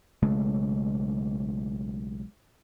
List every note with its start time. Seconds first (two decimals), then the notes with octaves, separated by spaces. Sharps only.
0.23 B1 C#3 G#3 A3